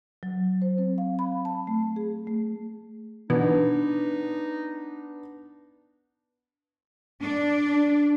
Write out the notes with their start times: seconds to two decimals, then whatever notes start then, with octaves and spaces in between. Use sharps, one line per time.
0.23 F#3
0.62 C5
0.78 C4
0.98 F5
1.19 B5
1.45 A5
1.67 A3
1.96 G#4
2.27 A3
3.30 B2 E3 B3 D4 D#4
7.22 D4